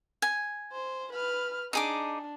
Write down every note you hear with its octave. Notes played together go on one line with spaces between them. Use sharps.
G#5
C5
B4 F6
D4 D#4 G#4 D6